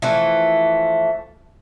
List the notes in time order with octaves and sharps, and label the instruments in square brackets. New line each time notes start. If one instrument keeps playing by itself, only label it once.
[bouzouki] E3 F3 A3